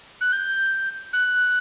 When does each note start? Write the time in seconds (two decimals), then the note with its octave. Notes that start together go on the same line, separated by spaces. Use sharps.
0.21 F#6
0.33 G6
1.13 F#6